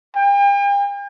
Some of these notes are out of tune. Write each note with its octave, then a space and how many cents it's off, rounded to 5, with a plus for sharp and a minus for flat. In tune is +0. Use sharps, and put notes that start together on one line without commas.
G5 +45